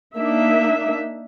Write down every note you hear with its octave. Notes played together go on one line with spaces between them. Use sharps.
A#3 D4 D#4 E5